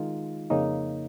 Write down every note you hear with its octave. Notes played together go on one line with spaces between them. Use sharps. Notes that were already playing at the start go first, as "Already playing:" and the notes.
Already playing: D#3 G#3 D#4 F4
F2 C#3 A#3 C#4 D#4